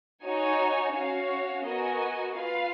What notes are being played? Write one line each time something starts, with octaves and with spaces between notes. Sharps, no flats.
D#4 F#4 C#5 G#5
C#4 F#4 C#5 F5
B3 F#4 A#4 D#5 G#5
F4 B4 F5